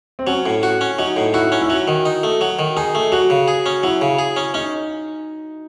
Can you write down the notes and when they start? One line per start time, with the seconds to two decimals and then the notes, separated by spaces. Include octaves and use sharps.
0.19 C4
0.27 F#3 C#4
0.46 A2
0.63 F#4
0.81 C#4
0.99 F#3 D#4
1.16 A2
1.34 E4 F#4
1.52 C#4
1.62 E4
1.70 F#3 F#4
1.88 D#3
2.05 D#4
2.23 A3
2.41 F#3
2.59 D#3
2.77 D#4 G#4
2.95 A3
3.12 F#3 F#4
3.30 C#3
3.48 G#4
3.66 C#4
3.83 F#3 E4
4.01 C#3
4.19 G#4
4.37 C#4
4.54 C#4 D#4